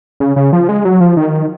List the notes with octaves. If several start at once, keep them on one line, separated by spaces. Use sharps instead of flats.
C#3
C#3
F3
G#3
F#3
F3
D#3